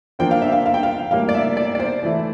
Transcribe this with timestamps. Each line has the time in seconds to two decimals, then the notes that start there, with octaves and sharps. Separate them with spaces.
0.19 F3 A#3 D4 F4 C5 G5
0.31 F5
0.42 E5
0.52 F5
0.66 F5
0.74 G5
0.83 F5
1.11 A2 G3 A#3 F5
1.29 D5
1.35 E5
1.57 D5
1.75 D5
1.80 C5
2.03 E3 A3 E4